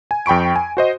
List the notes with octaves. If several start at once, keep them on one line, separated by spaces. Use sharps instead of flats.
G#5
F2 G5 B5 C#6 D7
G#5
F#4 C5 D#5